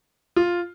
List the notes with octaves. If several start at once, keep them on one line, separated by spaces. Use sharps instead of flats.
F4